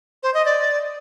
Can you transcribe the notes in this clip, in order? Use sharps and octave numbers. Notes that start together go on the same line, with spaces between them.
C5
D#5
D5